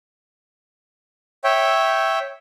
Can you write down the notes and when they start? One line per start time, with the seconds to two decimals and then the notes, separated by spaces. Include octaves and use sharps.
1.44 C#5 E5 G5